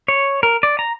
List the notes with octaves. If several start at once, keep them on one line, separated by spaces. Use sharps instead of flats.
C#5
A#4
D5
A#5